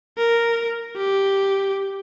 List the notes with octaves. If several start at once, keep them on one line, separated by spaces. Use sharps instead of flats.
A#4
G4